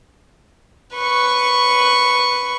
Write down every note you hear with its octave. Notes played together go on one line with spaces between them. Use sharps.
B4 C#6